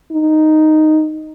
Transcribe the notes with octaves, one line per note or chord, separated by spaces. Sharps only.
D#4